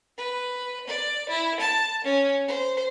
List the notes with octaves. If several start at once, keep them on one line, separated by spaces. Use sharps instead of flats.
B4
D5
E4
A5
C#4
C5